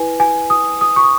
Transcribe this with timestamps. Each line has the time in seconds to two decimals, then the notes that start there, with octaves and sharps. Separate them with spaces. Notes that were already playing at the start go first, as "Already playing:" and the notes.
Already playing: E4 B4 G#5
0.20 G#5
0.50 D#6
0.81 D#6
0.96 C#6
1.04 D#6